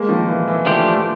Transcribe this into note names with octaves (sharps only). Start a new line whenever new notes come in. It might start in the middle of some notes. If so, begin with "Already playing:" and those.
Already playing: G#3 A#3
D#3 F3
E3
E3
F3 A3 D4 G4 C5